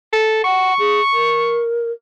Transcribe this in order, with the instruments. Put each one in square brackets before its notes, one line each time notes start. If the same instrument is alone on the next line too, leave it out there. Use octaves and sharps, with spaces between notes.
[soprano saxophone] A4
[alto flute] F#5 [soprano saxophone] C#6
[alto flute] G#4
A#4